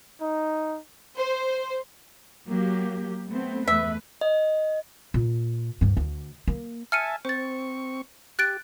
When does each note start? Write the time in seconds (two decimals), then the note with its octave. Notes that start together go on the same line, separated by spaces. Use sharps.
0.21 D#4
1.16 C5
2.48 F#3 A#3 G4
3.27 A3 B3 C4
3.68 E2 A3 B4 E5
4.21 D#5
5.14 A#2
5.81 D2 G2
5.97 D2
6.48 A#3
6.92 E5 G#5 A5 F6 C#7 D#7
7.25 C4 C5 C#6 A6
8.39 G4 F#6 A6 D7